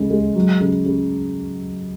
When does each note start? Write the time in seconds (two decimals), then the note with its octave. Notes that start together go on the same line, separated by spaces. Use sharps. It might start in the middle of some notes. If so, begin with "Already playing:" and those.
Already playing: C#3 G#3
0.10 G#3
0.35 F#3
0.60 C#3
0.85 C#3